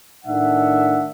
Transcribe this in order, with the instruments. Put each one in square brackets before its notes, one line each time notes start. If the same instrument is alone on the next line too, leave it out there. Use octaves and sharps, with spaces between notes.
[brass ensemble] A2 D#3 A3 D4 E5 F#5